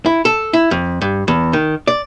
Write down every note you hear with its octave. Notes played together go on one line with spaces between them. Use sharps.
E4
A4
E4
F2
G2
E2
D#3
D5